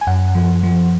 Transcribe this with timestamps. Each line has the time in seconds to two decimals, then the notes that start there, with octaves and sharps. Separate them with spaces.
0.01 G#5
0.07 F#2 F#5
0.35 F3
0.63 F3